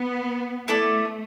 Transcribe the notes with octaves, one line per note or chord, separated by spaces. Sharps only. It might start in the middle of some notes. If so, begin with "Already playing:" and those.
Already playing: B3
A3 E4 A4 D5